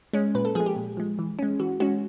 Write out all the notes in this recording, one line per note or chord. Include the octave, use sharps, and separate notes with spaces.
G#3 C#4
A#2 B4
A4
F3 G#3 G#4
G4
A#2
F3 G#3
E3
G#3 C#4
E3 F#4
G#3 C#4 F#4